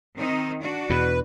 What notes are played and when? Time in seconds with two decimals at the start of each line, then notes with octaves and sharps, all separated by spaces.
0.16 D#3 C4 D#4
0.60 D4 F#4
0.90 E2 B2 B4